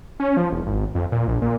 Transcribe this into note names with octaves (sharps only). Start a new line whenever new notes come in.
C#4
F3
E1
G#1
F2
A#2
A#1
A#2